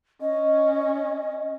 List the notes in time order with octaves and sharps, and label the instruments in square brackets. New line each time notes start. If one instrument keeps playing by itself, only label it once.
[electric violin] C#4 [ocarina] D#5